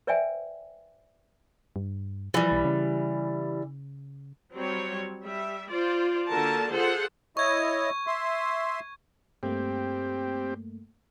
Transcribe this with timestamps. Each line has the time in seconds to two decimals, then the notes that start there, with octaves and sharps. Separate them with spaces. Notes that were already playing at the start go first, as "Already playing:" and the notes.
0.07 B4 C5 D5 E5 G5 G#5
1.76 G2
2.34 E3 F3 G3
2.52 B1
2.65 C#3
4.55 F#3 G3 C4 C#5
5.22 G3 E5
5.70 F4 C5 D5
6.28 D3 A#3 F#4 A#4 A5
6.72 F4 G#4 A4 C5 F#5
7.37 E4 C#5 D#5 C#6 G#6
8.07 E5 C6
9.43 G2 A3 A#3 C4 G4